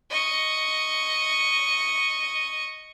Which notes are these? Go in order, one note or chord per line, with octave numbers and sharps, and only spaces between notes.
D#5 C#6